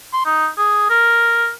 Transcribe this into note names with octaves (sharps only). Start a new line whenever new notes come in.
C6
D#4
G#4
A#4